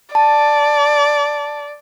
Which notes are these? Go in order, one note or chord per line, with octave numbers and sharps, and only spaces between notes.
D5 A5